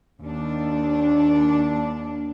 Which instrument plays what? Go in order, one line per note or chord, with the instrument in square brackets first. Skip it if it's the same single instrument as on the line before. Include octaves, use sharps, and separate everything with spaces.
[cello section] D#2 D4